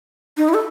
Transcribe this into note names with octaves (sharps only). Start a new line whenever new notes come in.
D#4
E4
A4